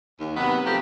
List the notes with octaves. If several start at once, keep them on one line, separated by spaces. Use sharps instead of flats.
D#2
C3 D#3 F#3 B3
F3 F#3 A3 A#3 C4 G4